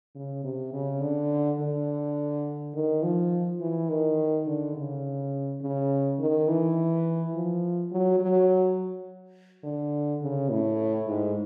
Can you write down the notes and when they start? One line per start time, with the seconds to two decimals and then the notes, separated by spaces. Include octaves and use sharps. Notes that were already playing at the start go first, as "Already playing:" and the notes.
0.15 C#3
0.44 C3
0.73 C#3
1.01 D3
1.60 D3
2.74 D#3
3.03 F3
3.61 E3
3.89 D#3
4.47 D3
4.76 C#3
5.61 C#3
6.19 D#3
6.48 E3
7.34 F3
7.92 F#3
8.20 F#3
9.64 D3
10.22 C#3
10.51 A2
11.08 G#2